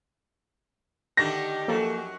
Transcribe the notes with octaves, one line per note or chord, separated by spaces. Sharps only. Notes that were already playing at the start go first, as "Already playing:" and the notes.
D3 D#3 A3 G4 A#6
F#2 F3 F#3 A#3 A4